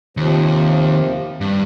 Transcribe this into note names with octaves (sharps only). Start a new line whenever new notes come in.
D#2 C3 F3
G2